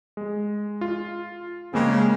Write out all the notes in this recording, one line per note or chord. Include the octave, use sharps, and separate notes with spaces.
G#3
F4
C#3 G#3 A#3 C4